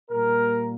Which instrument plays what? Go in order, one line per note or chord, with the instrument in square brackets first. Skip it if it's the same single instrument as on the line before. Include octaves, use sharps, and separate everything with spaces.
[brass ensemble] A#2 G3 A#3 A#4